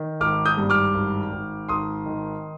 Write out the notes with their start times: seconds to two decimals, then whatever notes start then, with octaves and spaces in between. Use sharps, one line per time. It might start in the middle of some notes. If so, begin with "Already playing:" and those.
Already playing: D#3
0.20 G#1 D6 F6
0.45 D#6 G6
0.58 G2
0.70 D6 F6
0.94 G#1
1.32 G#1
1.69 G#1 C6 D#6
2.06 D#3